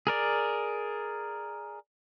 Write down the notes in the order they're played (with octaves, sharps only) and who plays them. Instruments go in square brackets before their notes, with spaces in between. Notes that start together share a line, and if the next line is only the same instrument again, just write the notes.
[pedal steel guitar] G#4 A#4 D5